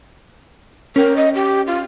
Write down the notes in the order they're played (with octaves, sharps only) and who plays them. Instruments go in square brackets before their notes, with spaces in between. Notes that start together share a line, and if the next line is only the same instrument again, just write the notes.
[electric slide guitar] C#4 G5 [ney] A#4
[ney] D#5
G4
F4